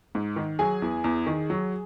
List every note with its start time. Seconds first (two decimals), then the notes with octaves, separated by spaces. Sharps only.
0.15 G#2
0.36 D#3
0.59 F#3 G#4 G#5
0.82 E2
1.04 E2
1.27 D#3
1.50 F#3